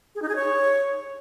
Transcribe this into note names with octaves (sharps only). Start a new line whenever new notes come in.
G#4
D#4
G#4
C#5